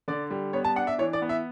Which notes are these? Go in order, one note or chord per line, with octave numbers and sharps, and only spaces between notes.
D3 D5
G3
B3 C#5
A5
D4 F#5
E5
E3 C#5
D5
B3
E5